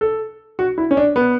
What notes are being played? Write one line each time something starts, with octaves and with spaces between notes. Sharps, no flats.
A4
F#4
E4
C#4
D4
B3